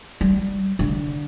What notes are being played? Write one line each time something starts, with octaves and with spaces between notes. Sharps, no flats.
G3
D3